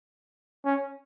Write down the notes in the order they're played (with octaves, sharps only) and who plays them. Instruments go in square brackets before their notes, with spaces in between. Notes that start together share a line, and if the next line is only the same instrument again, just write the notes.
[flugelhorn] C#4